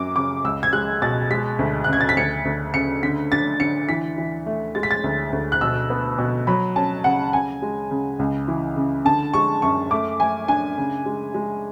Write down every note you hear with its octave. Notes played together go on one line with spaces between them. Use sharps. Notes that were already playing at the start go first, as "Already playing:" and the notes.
Already playing: F#2 F#3 D6
C#3 D6
C#2 E6
G#6
G#3 F#6
B2 A6
G#3 B6
D2
F#6
C#3 G#6
A6
B6
D2 C#7
D2
C#3 C#7
D3 B6
D4 A6
D3 C#7
E3 B6
E3
A3
G#3 A6
B6
A6
D2
D2
F#6
B2 E6
B3
B2
F#3 B5
C#4 A5
C#3 F#5
C#3 G#5
G#3
C#3
C#2
E3
C#3
D3 A5
G#3 C#6
F#2 C#6
A3 D6
A3 G#5
D4 G#5
C#3
G#3
G#3